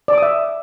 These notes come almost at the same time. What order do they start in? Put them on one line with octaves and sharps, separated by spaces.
D5 D6 D#6 E5